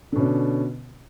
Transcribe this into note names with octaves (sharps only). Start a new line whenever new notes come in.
B2 D3 C#4 D4